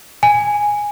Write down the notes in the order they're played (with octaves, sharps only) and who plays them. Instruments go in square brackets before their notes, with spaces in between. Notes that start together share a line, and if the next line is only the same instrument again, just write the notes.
[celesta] G#5